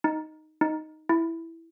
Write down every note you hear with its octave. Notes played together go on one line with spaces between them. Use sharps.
D#4
D#4
E4